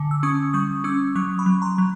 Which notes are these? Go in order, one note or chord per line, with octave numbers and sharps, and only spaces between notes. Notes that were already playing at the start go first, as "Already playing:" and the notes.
Already playing: D3
E6
C#4 C#6 D#6
G3 C#6 D#6
C#4 D6 E6
F#3 C#6 D#6
B5 C#6
F#3
A#5 C6
F#3